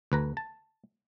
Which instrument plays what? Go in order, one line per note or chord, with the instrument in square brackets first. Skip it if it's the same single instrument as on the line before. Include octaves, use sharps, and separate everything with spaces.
[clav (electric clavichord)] D2 B4 A#5
A5